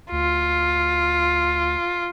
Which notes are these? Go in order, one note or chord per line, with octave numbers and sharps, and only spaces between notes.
D2 F4